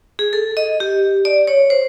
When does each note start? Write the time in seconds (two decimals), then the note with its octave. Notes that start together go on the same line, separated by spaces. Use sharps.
0.19 G#4
0.33 A4
0.57 D#5
0.80 G4
1.25 D5
1.47 C#5
1.70 C5